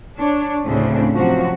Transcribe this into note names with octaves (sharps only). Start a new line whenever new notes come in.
D4 C#5
D2 A2 C#3 A3 C4 D4
C3 F3 F#3 F#4